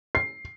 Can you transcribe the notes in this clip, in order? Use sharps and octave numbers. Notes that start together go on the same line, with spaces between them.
C7